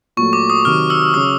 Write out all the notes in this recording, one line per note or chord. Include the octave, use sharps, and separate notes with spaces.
A#2 F#3 A3 C#6
D6
D#6
C3 D#3 F#3 F6
E6
C#3 F#3 D#6